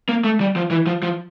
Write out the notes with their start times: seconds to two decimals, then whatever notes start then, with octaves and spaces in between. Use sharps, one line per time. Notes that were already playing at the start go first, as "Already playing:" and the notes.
0.09 A#3
0.24 A3
0.40 G3
0.56 F3
0.71 E3
0.86 F3
1.03 F3